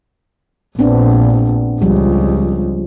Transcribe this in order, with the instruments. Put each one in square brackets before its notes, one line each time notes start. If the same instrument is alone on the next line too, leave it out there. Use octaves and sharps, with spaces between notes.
[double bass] A#1 [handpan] B3 C4 D4
[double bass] C#2 [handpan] F3 G3